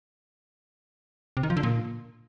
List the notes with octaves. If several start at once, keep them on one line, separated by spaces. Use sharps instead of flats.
C3
D#3
F3
D3
A#2